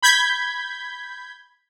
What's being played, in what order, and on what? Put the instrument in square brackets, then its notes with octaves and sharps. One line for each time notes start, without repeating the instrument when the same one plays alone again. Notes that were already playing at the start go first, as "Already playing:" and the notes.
[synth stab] B5 G6 G#6 B6